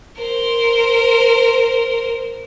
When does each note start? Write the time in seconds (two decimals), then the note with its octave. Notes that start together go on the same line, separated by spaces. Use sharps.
0.18 A#4 C5